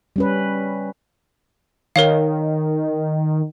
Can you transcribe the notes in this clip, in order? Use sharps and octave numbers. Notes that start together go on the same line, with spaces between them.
G3 C#4 B4
D#3 A#4 C#5 F5